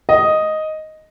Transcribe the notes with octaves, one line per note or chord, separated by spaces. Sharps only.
D#5